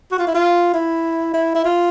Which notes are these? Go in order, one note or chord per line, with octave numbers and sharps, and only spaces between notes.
F#4
F4
E4
F4
E4
E4
E4
F4